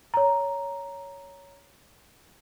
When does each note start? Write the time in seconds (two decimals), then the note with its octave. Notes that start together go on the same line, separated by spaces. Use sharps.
0.14 C#5 A#5